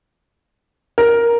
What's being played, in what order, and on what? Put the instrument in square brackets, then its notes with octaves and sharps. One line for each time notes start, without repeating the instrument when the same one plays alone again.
[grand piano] A#4